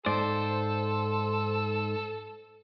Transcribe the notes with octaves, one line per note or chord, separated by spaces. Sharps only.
G#2 A4 C5 D5